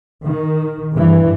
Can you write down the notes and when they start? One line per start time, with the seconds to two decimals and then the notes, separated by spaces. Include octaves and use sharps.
0.25 D#3
0.95 G2 E3